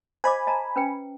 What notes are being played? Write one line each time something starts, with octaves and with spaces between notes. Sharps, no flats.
C5 D#5 G#5 B5 D6
D#5 A5 A#5
C#4 B4 G5